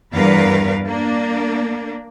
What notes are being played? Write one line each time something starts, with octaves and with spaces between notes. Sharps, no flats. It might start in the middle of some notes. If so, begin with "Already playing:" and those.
E2 G2 A#4 B4 F5
A#3 D4